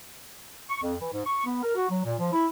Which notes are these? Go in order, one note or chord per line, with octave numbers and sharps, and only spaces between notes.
C#6
F2
E3
G#2
C#6
B3
A#4
F#4
F#3
A#2
F3
E4